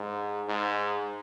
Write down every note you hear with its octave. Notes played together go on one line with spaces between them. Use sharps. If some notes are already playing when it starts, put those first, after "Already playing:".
Already playing: G#2
G#2